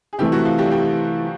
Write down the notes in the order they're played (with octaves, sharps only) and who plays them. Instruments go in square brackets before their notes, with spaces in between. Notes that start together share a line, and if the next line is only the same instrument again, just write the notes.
[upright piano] G#4
[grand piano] C3 E3 A3 [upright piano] G3 G4
[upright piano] F#3 F#4
F3 F4
G3 G4
G3 G4